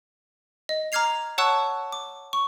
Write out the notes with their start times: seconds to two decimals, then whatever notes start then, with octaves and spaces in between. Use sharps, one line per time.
0.69 D#5
0.92 A#5 D6 F6 G#6 C7 F7
1.38 C#5 F#5 A5 C#6 E6 F#6
1.92 D6
2.33 C#6